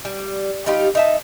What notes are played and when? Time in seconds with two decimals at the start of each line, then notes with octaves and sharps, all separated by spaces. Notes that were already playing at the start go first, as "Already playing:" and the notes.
0.05 G3
0.66 G3 D#4 F4 G4
0.95 D#4 E5 A5